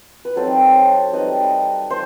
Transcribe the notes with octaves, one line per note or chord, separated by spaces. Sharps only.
B4
F#3 C4 D#4 A4 C5
G3 D#4 B4 D#5
A3 C5